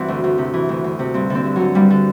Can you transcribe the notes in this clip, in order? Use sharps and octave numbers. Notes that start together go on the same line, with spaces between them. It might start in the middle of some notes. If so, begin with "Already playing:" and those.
Already playing: G2 E3 C4 E4 F#4
D2
D2
C3
E3
D2
D2
C3
G2 C4
D3 C4
G2
D3 F#3
G2 G3
D3